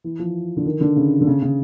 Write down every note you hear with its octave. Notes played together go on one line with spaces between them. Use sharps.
E3
F3
D3
D#3
D3
C#3
D3
C#3
C#3